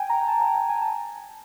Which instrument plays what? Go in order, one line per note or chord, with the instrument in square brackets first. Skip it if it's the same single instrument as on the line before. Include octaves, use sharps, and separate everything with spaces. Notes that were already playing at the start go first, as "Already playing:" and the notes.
Already playing: [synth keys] G5 G#5
A#5
A5
A#5
A5
G#5
A5